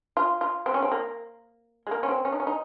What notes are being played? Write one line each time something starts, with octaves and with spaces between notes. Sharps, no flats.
F4
F4
C4
C#4
C4
A#3
G#3
A#3
C#4
C4
C#4
D#4
C#4
D#4